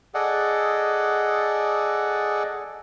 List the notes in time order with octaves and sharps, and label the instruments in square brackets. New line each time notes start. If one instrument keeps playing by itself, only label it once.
[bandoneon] G#4 A4 D5 D#5 F#5